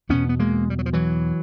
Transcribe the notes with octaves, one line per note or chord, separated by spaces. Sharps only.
E2 B2 B3 C#4
B3
G#3 A#3
G3
F#3
F3
E3 F#3